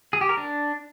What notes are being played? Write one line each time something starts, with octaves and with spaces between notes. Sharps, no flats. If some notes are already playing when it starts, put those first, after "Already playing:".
G#4
G4
A#4
D4